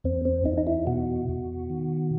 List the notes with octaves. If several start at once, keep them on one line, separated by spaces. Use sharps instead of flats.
E2 C4
C4
E2 D#4
D#4
E4
B2 F#4
B2
D#3